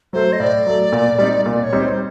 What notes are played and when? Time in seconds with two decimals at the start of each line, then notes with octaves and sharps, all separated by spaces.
0.13 F#3 A3 C5
0.33 D#5
0.40 A2 D5
0.67 F#3 A3
0.92 A#2
1.18 G3 C4 D#4
1.45 A#2 D5
1.63 C#5
1.73 G3 C4 D#4
1.80 C5